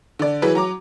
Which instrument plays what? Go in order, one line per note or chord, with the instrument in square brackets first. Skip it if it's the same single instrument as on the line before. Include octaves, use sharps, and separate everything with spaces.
[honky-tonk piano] D3 D5
E3 F#3 G#4 B4
F#3 A#5 D6